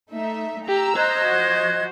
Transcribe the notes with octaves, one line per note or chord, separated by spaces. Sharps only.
A3 D#4 E5
G4 A#5 E6
C5 D#5 F#6 G#6
F3 F#4